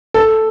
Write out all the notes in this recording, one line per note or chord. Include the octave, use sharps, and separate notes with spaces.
A4